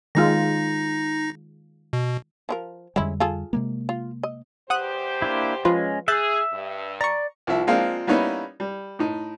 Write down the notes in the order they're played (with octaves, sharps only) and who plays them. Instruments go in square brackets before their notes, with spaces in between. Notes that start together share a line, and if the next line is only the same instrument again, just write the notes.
[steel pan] D#3 G#3 F4 [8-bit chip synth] D#4 A#6
[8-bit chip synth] B2
[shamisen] F3 F4 A#4
[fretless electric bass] F2 D3 G3 [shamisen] G#3 C#4 E4
[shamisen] F4 G#4 A4
[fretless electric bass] C3 G#3 A#3
[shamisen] F4
D#5
[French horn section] E2 G4 C5 [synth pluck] F#5 D#6 F#6
[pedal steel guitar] A#3 D4 E4
[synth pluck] F3 F4 B4 [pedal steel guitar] G#3 C#4
[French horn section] G#4 [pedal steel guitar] E5 E6 [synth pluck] F#6 G6 A6
[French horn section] G2
[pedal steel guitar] D5 [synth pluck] A#5 C#6
[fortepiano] C2 F3 E5
F3 G#3 A#3 C4 D4 F4
G3 A#3 B3 C#4 D#4 E4
G3
A2 D#4